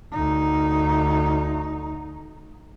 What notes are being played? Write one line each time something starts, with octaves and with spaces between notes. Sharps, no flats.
D2 D#4